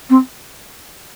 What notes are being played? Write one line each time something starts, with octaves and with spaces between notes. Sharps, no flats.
C4